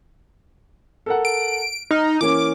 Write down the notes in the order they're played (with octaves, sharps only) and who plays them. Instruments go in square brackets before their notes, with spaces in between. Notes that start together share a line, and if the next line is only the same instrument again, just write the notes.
[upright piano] A4 A#4 F#5
[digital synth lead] D7
[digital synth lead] D#4 [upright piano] F6
[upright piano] E3 A#3 C#4 [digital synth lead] D6